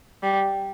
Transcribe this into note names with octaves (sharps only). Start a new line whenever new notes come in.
G3